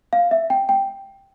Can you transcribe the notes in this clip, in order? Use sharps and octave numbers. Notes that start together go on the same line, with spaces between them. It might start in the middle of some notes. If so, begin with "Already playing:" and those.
F5
E5
G5
G5